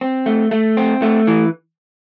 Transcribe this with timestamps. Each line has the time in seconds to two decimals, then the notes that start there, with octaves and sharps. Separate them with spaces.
0.01 C4
0.26 A3
0.51 A3
0.77 C4
1.02 A3
1.27 E3